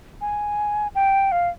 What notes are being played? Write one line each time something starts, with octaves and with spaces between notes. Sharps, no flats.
G#5
G5
F5